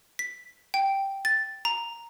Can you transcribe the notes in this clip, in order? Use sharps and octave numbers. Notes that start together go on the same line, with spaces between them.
B6
G5
A6
A#5